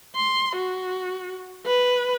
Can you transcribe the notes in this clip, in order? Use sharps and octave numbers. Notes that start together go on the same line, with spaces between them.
C6
F#4
B4